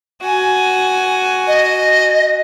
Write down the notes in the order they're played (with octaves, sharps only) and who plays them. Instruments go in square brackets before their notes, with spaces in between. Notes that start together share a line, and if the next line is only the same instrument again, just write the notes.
[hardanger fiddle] F#4 G#5
[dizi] D#5